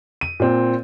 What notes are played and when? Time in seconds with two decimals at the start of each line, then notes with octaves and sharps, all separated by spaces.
0.21 D#7
0.40 A#2 C4